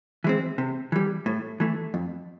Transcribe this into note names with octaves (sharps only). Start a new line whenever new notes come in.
E3 G#3 C4
C3
E3 G3
A2
E3 A3
F2